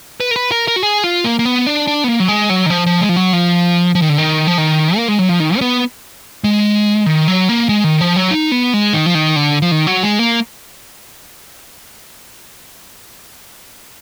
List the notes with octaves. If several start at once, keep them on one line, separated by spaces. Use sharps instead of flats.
B4
A#4
B4
A#4
A#4
F#4
G#4
F4
A#3
A#3
B3
D4
D4
B3
A#3
F#3
G#3
F#3
D#3
F3
F3
G#3
F3
F#3
F3
F3
D#3
D3
D#3
F3
D#3
A#3
G#3
F#3
F3
D#3
D4
B3
G#3
D#3
F#3
A#3
G#3
D#3
F3
F#3
D#4
B3
G#3
D#3
F3
D#3
D3
F3
D#3
F#3
G#3
A#3